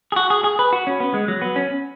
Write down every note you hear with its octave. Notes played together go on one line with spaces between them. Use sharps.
G#4
F#4
G#4
G#4
B4
F#4
C#4
B3
G#3
F#3
B3
C#4